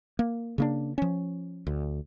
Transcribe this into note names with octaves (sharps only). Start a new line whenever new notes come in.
A#3
C#3 A#3 D4
F3 C#4
D2